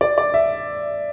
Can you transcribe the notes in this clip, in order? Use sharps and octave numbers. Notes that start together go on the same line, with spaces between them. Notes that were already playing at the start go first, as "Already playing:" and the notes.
D5
D5
E5